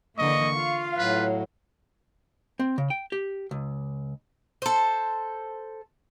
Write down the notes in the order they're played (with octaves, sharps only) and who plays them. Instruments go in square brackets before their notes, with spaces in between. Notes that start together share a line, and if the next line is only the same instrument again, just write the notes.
[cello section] D3 E3 A#3 [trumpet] D#5 [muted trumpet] C#6
[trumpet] F4 [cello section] F5
[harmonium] A2 F#3 [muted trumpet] B4
[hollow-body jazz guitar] C4
C#3
G5
G4
C#2
[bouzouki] A4 C5